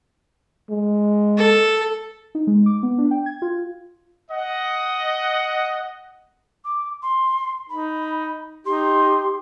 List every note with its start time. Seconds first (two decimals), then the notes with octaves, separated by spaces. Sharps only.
0.70 G#3
1.37 A4
2.35 D#4
2.47 G#3
2.66 D6
2.83 B3
2.98 D4
3.11 G5
3.26 G#6
3.42 F4
4.31 D#5 F#5
6.64 D6
7.02 C6
7.69 D#4 B5
8.66 D#4 G4 C6